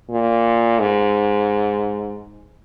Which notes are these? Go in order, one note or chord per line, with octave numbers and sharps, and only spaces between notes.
A#2
G#2